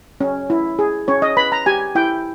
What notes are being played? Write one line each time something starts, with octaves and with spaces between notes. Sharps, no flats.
C#4
E4
G#4
C#4 C#5
D#5
B4 B5
A#5
G4 G#5
E4 G5